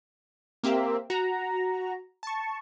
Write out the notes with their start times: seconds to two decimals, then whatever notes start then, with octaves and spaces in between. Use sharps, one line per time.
0.63 A#3 C4 G4 E5
1.10 F#4 A#5
2.23 A5 C#6